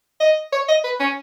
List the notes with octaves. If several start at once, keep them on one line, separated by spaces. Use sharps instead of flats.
D#5
C#5
D#5
B4
C#4